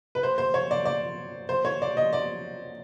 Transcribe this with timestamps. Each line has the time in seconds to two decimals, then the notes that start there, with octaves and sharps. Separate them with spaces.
0.15 B4
0.23 C5
0.38 C5
0.54 C#5
0.71 D5
0.85 D5
1.49 C5
1.65 C#5
1.82 D5
1.97 D#5
2.13 D5